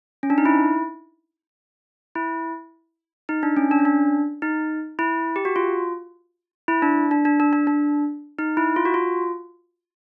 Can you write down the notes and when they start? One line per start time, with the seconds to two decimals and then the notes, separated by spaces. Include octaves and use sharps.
0.23 C#4
0.30 D4
0.38 D#4
0.45 E4
2.15 E4
3.29 D#4
3.43 D4
3.57 C#4
3.71 D4
3.79 C#4
3.85 D4
4.42 D#4
4.99 E4
5.36 G4
5.45 F#4
5.56 F4
6.68 E4
6.82 D4
7.11 D4
7.25 D4
7.40 D4
7.53 D4
7.67 D4
8.39 D#4
8.57 E4
8.76 F4
8.85 F#4
8.94 F4